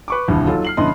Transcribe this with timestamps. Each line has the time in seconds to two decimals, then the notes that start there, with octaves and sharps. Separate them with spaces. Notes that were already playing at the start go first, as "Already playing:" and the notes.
0.08 B4 C#6 D6
0.28 D#1 C2 G2 E3
0.47 F#3 D#4 F4 A4
0.65 F6 C7 F#7
0.77 G2 C#3 E3 B3 D#5 C6